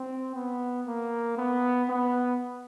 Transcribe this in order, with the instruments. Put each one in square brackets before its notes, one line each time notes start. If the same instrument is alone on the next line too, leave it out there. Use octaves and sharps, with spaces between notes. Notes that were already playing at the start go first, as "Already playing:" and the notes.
Already playing: [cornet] C4
B3
A#3
B3
B3